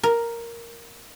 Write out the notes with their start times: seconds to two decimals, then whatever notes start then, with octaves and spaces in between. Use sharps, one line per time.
0.04 A#4